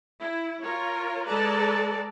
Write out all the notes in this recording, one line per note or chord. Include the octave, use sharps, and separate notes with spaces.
E4
F4 A#4 C#5
G#3 A4 B4 D5 A5 A#5